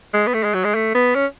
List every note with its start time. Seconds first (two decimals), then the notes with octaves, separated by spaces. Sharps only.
0.14 G#3
0.27 B3
0.34 A3
0.44 G#3
0.54 F#3
0.64 G#3
0.75 A3
0.95 B3
1.15 C#4